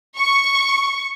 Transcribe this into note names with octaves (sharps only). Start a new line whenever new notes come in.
C#6